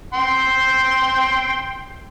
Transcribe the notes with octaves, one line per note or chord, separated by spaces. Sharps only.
G5 C6